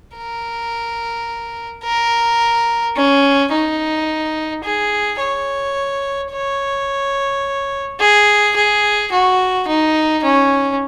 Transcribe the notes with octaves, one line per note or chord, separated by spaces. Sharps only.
A#4
A#4
C#4
D#4
G#4
C#5
C#5
G#4
G#4
F#4
D#4
C#4